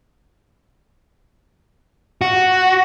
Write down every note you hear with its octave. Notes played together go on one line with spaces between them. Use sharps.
F#4